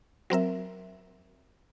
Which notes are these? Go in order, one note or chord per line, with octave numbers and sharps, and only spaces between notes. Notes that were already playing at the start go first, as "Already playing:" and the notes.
F#3 C4 A#4 E5